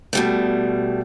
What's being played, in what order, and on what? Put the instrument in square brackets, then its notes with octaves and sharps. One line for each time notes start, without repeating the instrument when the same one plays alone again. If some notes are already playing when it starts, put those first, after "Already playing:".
[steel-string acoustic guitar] B2 G3 A3